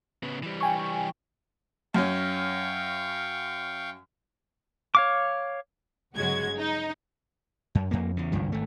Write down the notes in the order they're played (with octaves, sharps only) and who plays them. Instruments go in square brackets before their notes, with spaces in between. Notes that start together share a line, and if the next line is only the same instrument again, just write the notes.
[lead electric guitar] C#3 B3
E3 G3
[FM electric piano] G5 G#5 C#6
[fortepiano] F#2 C#4 [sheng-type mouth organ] F5 G5 C#6
[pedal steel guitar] C#5 F5 D6
[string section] G1 C#3 F#3 G#3 F#4 G#6
D#4
[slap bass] F#2
F2 A#3
E2 C#3
G#1 C#2 G2 F3
G#1 A3